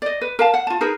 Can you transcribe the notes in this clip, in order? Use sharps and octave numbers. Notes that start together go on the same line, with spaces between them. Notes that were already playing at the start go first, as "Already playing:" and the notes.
D5 D#5
B4
A#4 F5 A5
F#5
F4 A5
D#4 G#4 A#4 B4